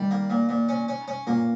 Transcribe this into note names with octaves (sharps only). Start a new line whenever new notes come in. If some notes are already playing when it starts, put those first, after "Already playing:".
Already playing: D#3 G3
A#3
A#2
A#2
C#4
C#4
C#4
A#2 A#3